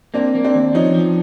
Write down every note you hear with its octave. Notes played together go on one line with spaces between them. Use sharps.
A#3 C4 D4
A#3
C4 D4
D#2
F3 C#4 D#4
F3